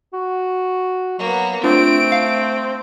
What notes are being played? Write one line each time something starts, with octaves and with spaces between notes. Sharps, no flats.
F#4
F#3 A#3 B3
A3 C4 D4 F4 D7
F5